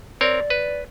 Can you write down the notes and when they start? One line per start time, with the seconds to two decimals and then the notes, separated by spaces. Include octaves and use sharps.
0.21 C4 A#4 C#5 D5
0.50 B4